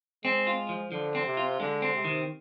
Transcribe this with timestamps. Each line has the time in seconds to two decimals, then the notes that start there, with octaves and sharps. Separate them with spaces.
0.24 G#3 C4
0.47 F4
0.69 F3
0.92 D3 F3
1.15 C4
1.26 C3
1.37 F4
1.60 D3 G#3
1.82 C4
1.94 C3
2.04 D#3